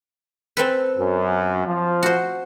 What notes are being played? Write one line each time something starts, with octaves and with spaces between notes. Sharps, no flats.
C4 A4 B4
F#2
F3
F#4 C5